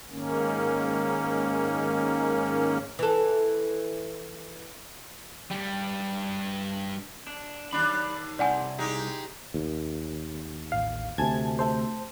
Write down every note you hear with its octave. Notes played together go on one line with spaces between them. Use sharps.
G#2 D#3 A#3 C#4
E3 A4
G2 G3
D4
D#2 D4 D5 B5
C2 C4 D5 F#5 G#5
G#3 D#4 G4
D#2
A1 F5
D2 C3 G#5 A5 G#6
A3 A4 C5